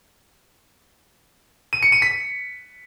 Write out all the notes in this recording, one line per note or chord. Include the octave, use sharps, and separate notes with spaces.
D#7
C#7
D#7
B6